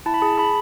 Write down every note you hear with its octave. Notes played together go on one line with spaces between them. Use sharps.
E4 A5
B5
G#4 A5
G#4 B5